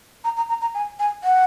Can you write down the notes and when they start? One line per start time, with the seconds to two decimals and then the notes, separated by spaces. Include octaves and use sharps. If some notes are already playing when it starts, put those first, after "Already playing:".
0.24 A#5
0.37 A#5
0.49 A#5
0.61 A#5
0.75 G#5
0.99 G#5
1.24 F#5